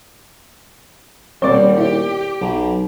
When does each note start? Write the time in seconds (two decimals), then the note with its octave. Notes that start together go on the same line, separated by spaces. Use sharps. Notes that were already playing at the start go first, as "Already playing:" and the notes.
1.42 D#1 B2 G3 C4 C#5 D5 D6
1.78 E4 G4
2.41 B1